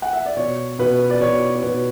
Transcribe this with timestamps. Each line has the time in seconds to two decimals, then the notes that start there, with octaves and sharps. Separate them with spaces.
0.02 F#5
0.13 E5
0.26 D5
0.36 B2 C#5
0.79 B2 B4
1.10 D5
1.20 B2 C#5
1.55 C#5
1.63 B2 B4